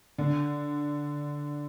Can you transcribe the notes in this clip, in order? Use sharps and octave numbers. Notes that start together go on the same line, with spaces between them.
D3